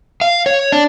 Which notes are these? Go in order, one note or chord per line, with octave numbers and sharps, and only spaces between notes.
F5
C#5
D4